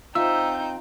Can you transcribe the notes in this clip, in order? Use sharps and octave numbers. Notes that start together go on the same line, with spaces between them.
C4 D#4 F4 E5 E6 G6